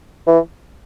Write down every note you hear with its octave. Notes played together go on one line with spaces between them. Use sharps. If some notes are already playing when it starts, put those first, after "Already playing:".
E3